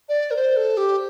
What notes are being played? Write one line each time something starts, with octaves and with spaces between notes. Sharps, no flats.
D5
A#4
C5
A4
G4